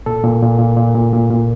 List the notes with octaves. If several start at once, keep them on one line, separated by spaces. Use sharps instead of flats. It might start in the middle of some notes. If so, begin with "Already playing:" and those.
A#2 A4
A#2
A#2
A#2
A#2
A#2
A#2
A#2